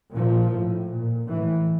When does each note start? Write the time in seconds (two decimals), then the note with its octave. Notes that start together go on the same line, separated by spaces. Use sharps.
0.14 A#2 F3
0.52 A2
0.90 A#2
1.29 A2 E3